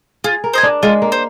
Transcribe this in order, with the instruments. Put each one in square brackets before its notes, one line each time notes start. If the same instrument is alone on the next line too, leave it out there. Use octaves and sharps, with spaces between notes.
[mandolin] F4 [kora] G#4
[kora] A#4
[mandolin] C5 D#5 G#5
[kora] D4
[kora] G#3 [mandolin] F4
[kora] A#3
[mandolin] C5